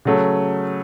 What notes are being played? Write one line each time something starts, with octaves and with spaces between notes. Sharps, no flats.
C#3 F#3 A3